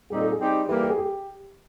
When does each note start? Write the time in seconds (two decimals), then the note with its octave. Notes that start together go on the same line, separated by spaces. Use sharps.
0.10 A#2 G3 C4 D#4 G#4
0.21 A4
0.32 G#4
0.39 G3 C4 D#4 G4
0.68 E3 G3 A#3 G4
0.83 G4
0.90 G#4
0.98 G4